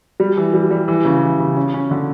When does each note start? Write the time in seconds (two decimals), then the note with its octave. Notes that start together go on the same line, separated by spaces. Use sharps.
0.20 G3
0.37 E3
0.54 G3
0.71 G3
0.88 E3
1.05 C#3
1.23 E3
1.39 C#3
1.57 C#4
1.74 C#4
1.91 D3